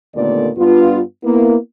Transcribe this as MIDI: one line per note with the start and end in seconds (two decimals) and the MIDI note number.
0.15 0.49 39
0.15 0.49 46
0.15 0.49 50
0.15 0.49 57
0.15 0.49 59
0.15 0.49 74
0.57 0.99 43
0.57 0.99 59
0.57 0.99 62
0.57 0.99 65
1.23 1.56 58
1.23 1.56 59
1.23 1.56 64